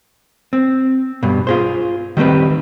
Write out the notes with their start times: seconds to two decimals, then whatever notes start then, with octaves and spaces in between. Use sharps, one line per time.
0.53 C4
1.23 G2 B2
1.47 F4 G#4 C5
2.17 D#3 G3 A3 C4 B4